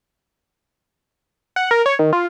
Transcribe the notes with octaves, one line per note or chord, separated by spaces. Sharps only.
F#5
A#4
C#5
D#3
F4